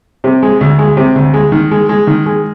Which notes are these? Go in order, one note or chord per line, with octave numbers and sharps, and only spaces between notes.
C3
G#3
D2
G#3
C3
D2
G#3
D#3
G#3
G#3
D#3
G#3